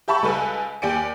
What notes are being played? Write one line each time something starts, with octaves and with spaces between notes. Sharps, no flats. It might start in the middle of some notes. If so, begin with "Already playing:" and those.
G4 E5 A5 B5 C#6
C#2 G3 A4 B4 G#5
D#2 G4 D5 G#5 C#7 D7